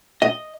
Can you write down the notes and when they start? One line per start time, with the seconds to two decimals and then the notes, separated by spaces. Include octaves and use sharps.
0.22 D#5